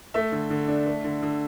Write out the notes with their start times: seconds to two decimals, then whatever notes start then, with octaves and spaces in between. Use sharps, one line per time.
0.14 A3 E5
0.32 D3
0.50 D3
0.68 D4
0.87 A3
1.04 D3
1.22 D3